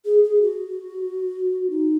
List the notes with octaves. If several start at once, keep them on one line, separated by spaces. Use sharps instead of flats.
G#4
G#4
F#4
D#4